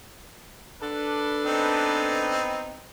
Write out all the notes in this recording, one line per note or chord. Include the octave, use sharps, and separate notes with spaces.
D4 A4 B4
B3 C4 D#4